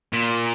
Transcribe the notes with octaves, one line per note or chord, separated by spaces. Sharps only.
A#2